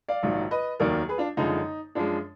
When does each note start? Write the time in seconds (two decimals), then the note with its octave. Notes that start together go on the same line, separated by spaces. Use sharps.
0.08 D5 F5
0.23 A#1 G#2 D#3 F#3
0.51 B4 D#5
0.80 F1 D#2 D#3 F#3 A#4 D5
1.09 G#4 B4
1.18 D4 F4
1.37 F#1 F#2 D3 F3 G#3 D#4
1.95 F#2 F3 G#3 D4